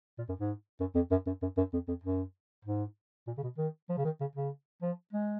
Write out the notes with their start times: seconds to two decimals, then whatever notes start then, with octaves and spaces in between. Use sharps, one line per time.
0.18 A#2
0.28 F#2
0.39 G#2
0.80 F#2
0.95 F2
1.11 F#2
1.27 F#2
1.42 F#2
1.57 F#2
1.73 F2
1.88 F2
2.04 F#2
2.65 G#2
3.27 A#2
3.38 C#3
3.43 B2
3.58 D#3
3.89 F3
3.97 C#3
4.05 D#3
4.20 C#3
4.35 C#3
4.82 F3
5.12 G#3